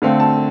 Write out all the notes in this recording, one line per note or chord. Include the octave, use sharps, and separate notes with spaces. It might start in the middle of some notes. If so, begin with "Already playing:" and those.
D3 A3 C4 F5
A5